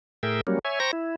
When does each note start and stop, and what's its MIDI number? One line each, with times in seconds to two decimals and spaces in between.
0.23 0.41 45
0.23 0.41 68
0.23 0.41 70
0.23 0.41 76
0.23 0.41 79
0.47 0.59 54
0.47 0.59 55
0.47 0.59 58
0.47 0.59 61
0.65 0.79 73
0.65 0.79 76
0.65 0.79 80
0.80 0.91 72
0.80 0.91 79
0.80 0.91 82
0.80 0.91 85
0.80 0.91 94
0.93 1.15 64